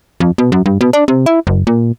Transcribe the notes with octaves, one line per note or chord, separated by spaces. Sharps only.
F2
B2
F#2
G2
B2
D4
C3
E4
F#1
A#2